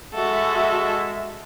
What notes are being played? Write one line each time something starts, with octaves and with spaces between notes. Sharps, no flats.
G#3 F#4 A4 E5